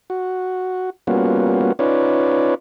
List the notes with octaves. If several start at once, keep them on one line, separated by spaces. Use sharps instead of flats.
F#4
G3 A#3 B3 C#4 F4 F#4
C#4 D#4 F4 B4 C#5 D5